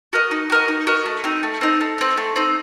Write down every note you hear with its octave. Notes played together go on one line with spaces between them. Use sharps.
F#4 A#4 D#5
D#4
F#4 A#4 D#5
D#4
F#4 A#4 D#5
A3
C4 D#4
A3
C4 D#4
A3
C4 D#4
A3
C4 D#4